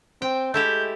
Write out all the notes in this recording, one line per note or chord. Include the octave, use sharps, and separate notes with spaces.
C4 G5
G#3 A3 E4 G4 G6